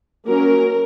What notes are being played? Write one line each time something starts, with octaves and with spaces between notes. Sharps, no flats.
F#3 A#3 C#4 A#4